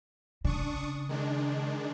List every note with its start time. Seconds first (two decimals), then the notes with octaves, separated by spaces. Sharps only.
0.45 C#3 D4 C#6 D#6
1.09 D#3 G#3 D4